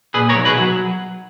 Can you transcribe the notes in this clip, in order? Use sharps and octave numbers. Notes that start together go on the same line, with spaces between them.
A#2 G#4 B4
A#4 C#5
B1
G#4 B4
F#3